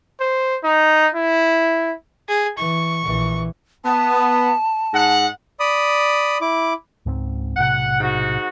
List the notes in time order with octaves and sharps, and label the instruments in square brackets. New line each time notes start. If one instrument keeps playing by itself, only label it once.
[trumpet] C5
D#4
E4
[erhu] G#4
[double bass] E3 [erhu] C#6
[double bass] A#1 E3
[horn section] B3 [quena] A5
[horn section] G#2 F#5
[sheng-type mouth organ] D5 B5 D#6
E4 D6
[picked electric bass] C#2 G#2 C4
[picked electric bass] B1 A2 C3 [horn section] F#5
[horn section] G#2 F#4